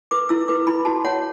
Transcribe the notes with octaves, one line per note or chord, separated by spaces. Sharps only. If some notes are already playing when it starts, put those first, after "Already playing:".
B4 D6
E4 E6
B4 D6
E4 B5
F#4 A5
C#5 F#5